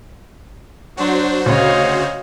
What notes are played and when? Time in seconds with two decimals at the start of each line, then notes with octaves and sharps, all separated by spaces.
0.97 F#3 D4 F#4 C5
1.46 D2 C#3 C#5 D#5 F5